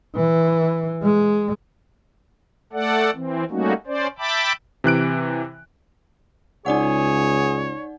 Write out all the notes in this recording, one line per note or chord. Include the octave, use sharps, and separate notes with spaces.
E3
G#3
A3 A4 D5 F#5
E3 C4
G3 A3 A#3 C#4 D#4 F#4
C#4 C5 D5
E5 G5 A5 B5 D6
C3 E3 F#6 D7
C#2 D#4 G#4 C#5 D5 F#5